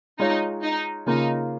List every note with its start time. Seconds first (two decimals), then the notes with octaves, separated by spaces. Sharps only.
0.19 G#3 D#4 F4 C#5
0.63 D#4
1.06 C#3 A#3 D#4 F4